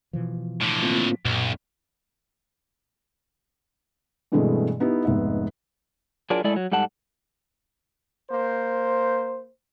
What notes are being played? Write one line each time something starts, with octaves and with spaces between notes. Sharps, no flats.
B2 E3 F3
A2 D3
A#3 C4 F4
B1 F#2 A#2
G2 B2 E3 G#3 A3 C4
B3 D#4 E4 G4
F1 G#2 B3 E5
F#3 D4 F4 G#4 A#4 D5
G#3 A3 E4 A4 D5
F#3
G#2 G3 A4 F#5 A5
A#3 C5